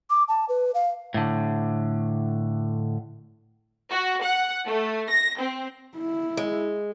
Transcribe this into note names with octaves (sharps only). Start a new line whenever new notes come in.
D6
A5
B4
F5
A2 D3
F#4
F#5
A3
A#6
C4
E4
G#3